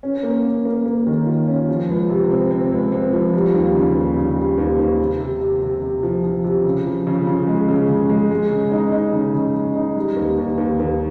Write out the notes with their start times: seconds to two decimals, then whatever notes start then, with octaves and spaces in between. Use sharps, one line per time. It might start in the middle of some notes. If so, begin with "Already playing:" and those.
0.03 C#4
0.23 A#3
0.44 C#4
0.65 A#3
0.86 A#3
1.07 D#3
1.26 F4
1.47 C#4
1.69 F3
1.89 C#2
2.09 C3
2.30 C4
2.51 C4
2.72 C#2
2.92 C4
3.13 F3
3.33 G3
3.54 D#2
3.75 C#3
3.96 D#2
4.17 C#3
4.37 G3
4.58 D#2
4.79 D#2
4.99 C3
5.20 C3
5.41 C3
5.62 C3
5.82 C3
6.03 F3
6.24 F3
6.44 C3
6.64 C#3
6.86 F3
7.07 C#3
7.27 C#3
7.47 G#3
7.68 C#3
7.89 C#3
8.10 G#3
8.31 G#3
8.52 C#3
8.72 D#4
8.92 D#4
9.13 C#3
9.34 C#3
9.54 C#3
9.75 D#4
9.96 G3
10.16 D#2
10.38 D#2
10.58 D#2
10.79 D#2